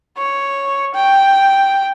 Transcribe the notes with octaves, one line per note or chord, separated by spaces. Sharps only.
C#5
G5